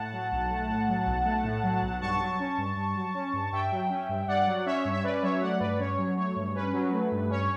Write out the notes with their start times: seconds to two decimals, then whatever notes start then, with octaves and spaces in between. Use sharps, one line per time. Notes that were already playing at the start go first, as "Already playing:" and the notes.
Already playing: A2 F#5 A5
0.12 F#3
0.32 B1
0.50 A3
0.69 A2
0.88 F#3
1.06 B1
1.25 A3
1.44 A2
1.63 F#3
1.82 B1
2.01 G2 A5 C#6
2.20 F#3
2.39 C#4
2.58 G2
2.76 G2
2.95 F#3
3.14 C#4
3.33 G2
3.52 G2 E5 G5
3.72 F#3
3.90 C#4
4.09 G2
4.27 G2 D5 F#5
4.46 F#3
4.66 C#4 C#5 E5
4.85 G2
4.92 E5
5.03 C#4 B4 D5
5.22 F#3 C#5 E5
5.41 A3 D5 F#5
5.60 G2 B4 D5
5.79 C#4 C#5
5.98 F#3
6.17 A3 C#5
6.36 G2
6.54 C#4 B4
6.73 F#3
6.92 A3
7.11 G2
7.30 C#4 C#5